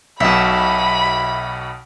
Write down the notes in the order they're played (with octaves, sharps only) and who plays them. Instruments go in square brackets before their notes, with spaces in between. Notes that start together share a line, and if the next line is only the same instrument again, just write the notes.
[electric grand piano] B1 B2 [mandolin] E5 [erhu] B5